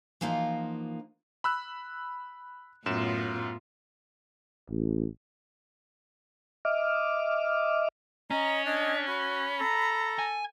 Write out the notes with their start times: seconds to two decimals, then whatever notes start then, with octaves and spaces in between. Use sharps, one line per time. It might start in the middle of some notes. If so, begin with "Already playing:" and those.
0.21 E3 F3 A#3 D#4 F4 F#4
1.44 B5 E6 F#6
2.86 F#2 A2 B3 F4 E7
4.70 A1
6.65 D#5 E5 D6 F6
8.31 C#4 D#5 A#5
8.66 D4 D#5
9.08 F#4 B5
9.61 A4 A#5
10.19 G#5